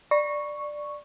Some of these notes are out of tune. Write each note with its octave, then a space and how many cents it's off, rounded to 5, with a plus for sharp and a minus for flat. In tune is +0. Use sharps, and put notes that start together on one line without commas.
D5 +10 C#6 +0